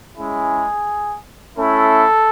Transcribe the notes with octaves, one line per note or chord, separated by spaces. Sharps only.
G#3 C#4 E4 G#4
A3 C#4 E4 A4